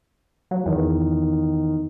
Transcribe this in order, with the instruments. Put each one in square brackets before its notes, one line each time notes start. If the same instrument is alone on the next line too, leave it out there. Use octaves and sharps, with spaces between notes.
[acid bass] F#3
[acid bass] E2 [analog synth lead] D#3